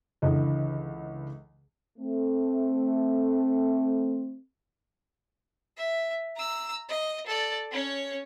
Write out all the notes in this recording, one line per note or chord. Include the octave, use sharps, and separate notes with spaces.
C#2 D3 E3 D#5
A3 C4
E5
A#5 E6
D#5
A4 D5
C#4 C#5